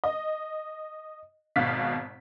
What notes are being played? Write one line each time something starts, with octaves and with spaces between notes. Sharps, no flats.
D#5
G#1 B2 F5 B6